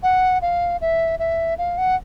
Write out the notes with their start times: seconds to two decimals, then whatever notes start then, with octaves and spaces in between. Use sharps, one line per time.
0.03 F#5
0.42 F5
0.81 E5
1.19 E5
1.58 F5
1.78 F#5